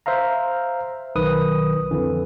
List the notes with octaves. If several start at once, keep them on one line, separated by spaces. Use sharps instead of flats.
C5 E5 F5 A#5
B1 D#3 B4 D#6
F2 D3 E3